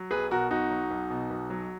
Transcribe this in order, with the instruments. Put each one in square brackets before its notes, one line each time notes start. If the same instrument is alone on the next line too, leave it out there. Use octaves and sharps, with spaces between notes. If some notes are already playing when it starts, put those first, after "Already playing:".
Already playing: [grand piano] F#3
B1 G#4 B4
B2 F#4 A#4
B1 D#4 F#4
F#3
B1
B2
B1
F#3